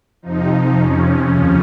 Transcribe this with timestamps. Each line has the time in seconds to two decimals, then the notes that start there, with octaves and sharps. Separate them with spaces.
0.22 F2 C3 F3 D#4
0.76 C#4
1.30 D#2 C#3 F3